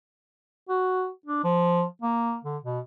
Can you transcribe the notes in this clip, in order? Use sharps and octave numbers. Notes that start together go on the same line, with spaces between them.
F#4
D4
F3
A#3
D3
B2